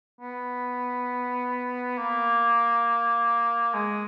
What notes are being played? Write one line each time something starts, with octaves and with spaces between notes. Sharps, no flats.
B3
A#3
G#3